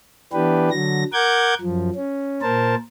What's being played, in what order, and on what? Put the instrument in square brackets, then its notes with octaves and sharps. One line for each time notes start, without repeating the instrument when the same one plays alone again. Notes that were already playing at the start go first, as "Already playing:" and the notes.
[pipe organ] E3 B3 D4 G4 B4
D3 F#3 A#6
A#4 F#5 D6 G6 G#6
F#2 F3
C#4
A#2 A#4 C5 A5